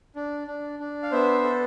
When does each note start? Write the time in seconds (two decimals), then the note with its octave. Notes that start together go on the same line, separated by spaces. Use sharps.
0.16 D4
0.47 D4
0.79 D4
1.03 F5
1.11 B3 C5 E5
1.44 A4